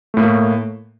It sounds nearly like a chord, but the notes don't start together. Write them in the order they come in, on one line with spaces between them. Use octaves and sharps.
A3 A2 A#3